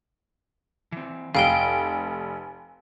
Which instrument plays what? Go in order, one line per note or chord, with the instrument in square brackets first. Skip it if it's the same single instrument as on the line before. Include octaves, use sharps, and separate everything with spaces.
[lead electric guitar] E3 C4
[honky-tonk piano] F1 D7 [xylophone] F5 G5 G7 [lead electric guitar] G#5